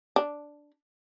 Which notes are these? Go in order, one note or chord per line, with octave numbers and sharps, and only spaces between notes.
D4